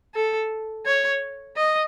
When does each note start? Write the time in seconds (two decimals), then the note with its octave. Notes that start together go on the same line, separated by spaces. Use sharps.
0.15 A4
0.86 C#5
1.56 D#5